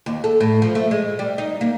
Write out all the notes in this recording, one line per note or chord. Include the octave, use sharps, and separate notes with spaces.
D#2
A4
A2
F3
A3
G#3
G3
D#4
A#3